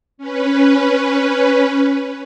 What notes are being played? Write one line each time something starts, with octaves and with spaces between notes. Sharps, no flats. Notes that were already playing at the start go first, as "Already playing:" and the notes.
C#4 B4